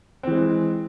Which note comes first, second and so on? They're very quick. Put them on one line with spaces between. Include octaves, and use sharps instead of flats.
C4 E3 G#3